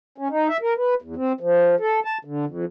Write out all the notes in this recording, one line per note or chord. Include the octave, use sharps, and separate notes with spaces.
C#4
D#4
E5
A#4
B4
E2
C4
F3
A4
A5
D3
F2